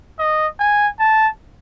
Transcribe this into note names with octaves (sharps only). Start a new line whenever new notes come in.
D#5
G#5
A5